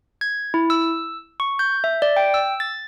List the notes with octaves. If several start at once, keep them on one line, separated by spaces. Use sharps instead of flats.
G#6
E4
E6
C#6
G6
E5
D5
G5
E6
A6